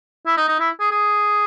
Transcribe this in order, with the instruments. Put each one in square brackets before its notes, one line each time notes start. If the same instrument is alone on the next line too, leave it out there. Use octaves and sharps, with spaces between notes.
[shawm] E4
D#4
D#4
E4
G#4
G#4